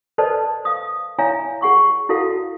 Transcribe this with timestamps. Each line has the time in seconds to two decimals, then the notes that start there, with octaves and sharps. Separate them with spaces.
0.18 A4 B4 C5 D5 D#5 A5
0.65 F5 D#6
1.19 E4 C#5 E5 F5 G#5 A#5
1.61 G#4 F#5 C#6 D6
2.09 E4 F#4 A4 F5 F#5